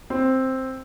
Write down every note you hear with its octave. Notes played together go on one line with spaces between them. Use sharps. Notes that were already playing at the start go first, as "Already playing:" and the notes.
C4